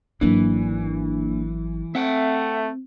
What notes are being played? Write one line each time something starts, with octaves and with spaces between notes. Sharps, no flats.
G#1 E3 F#3 A#3 D4
A3 C4 E5 F#5 G5